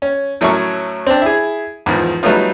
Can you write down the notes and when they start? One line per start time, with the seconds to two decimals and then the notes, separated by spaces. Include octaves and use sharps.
0.02 C#4
0.41 A2 F#3 A3 C#4 A#4 C#6
1.07 C4 D4
1.22 E4 G#4
1.86 E2 G#2 D#3 F3
2.23 F#3 G3 A3 B3 D#4 F4